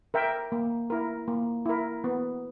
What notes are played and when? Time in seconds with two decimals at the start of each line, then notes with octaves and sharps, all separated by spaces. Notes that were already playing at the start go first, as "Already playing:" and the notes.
0.14 A#4 E5 G5
0.52 A#3
0.90 E4 A#4
1.28 A#3
1.66 E4 A#4
2.04 B3